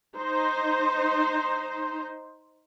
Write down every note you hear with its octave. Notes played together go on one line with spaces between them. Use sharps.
D#4 C5